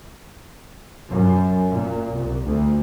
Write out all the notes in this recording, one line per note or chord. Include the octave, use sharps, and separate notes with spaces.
F#2
A#2
C2
D2